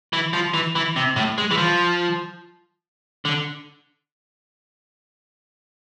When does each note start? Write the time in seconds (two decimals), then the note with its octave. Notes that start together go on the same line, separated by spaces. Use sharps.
0.13 E3
0.33 F3
0.54 E3
0.75 E3
0.96 C3
1.16 A2
1.38 G#3
1.51 E3
1.57 F3
3.25 D3